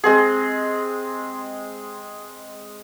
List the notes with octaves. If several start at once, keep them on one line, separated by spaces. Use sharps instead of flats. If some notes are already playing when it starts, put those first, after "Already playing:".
G#3 C4 G#4